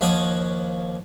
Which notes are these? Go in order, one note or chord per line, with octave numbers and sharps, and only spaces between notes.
D#2 F3 F#4 C#5 D6 D#6